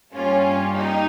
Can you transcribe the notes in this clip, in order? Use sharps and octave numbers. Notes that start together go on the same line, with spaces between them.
G2 G3 A#3 C#4 F4
D#4 G4